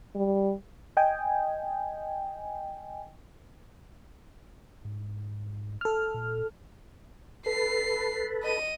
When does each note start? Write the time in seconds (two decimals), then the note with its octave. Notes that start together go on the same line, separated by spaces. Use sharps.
0.15 G3
0.97 D#5 G5 G#5
4.85 G#2
5.81 A4 F6
6.14 A#2
7.46 A4 B4 C7
8.42 D#5 D#7